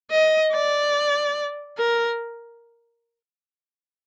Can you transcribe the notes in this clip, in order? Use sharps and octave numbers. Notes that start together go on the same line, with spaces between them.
D#5
D5
A#4